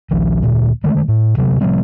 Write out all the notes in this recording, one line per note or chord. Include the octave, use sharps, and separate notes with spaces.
A#1 D#3 F3
D2 A#2
D3 D#3 G#3 A3
A2
D2 C3 F#3
C3 F3 G3 C4